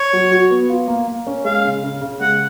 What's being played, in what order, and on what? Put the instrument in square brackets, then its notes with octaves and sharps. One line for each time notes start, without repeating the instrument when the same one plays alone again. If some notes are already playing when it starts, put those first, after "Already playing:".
Already playing: [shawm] C#5
[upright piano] F#3
F#4
B3
F4
A#3
A#3
C#4
[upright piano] G#3 [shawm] F5
[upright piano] C#3
C#3
C#3
[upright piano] G#3 [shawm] F#5